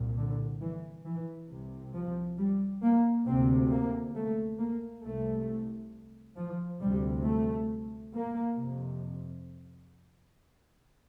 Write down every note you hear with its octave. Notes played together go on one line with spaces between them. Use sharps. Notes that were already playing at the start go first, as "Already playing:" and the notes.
Already playing: C2 A#2
D3
E3
E3
C2 C3
F3
G3
A#3
D2 C3 C4
A#3
A3
A#3
C2 C3 A3
F3
D2 C3 G3
A3
A#3
F2 C3